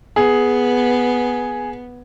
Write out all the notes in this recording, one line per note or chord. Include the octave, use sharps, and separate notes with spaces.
B3 G#4